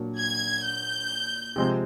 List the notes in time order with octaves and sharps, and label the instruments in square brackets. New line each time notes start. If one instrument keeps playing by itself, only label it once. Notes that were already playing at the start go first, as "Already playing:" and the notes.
Already playing: [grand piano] A#2 F#3 A#3 D4 F#4
[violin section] G#6
G6
[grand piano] C3 F3 G#3 C4